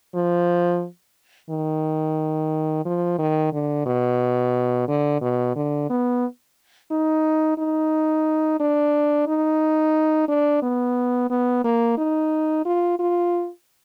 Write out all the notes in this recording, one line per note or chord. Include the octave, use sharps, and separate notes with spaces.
F3
D#3
F3
D#3
D3
B2
D3
B2
D3
B3
D#4
D#4
D4
D#4
D4
B3
B3
A#3
D#4
F4
F4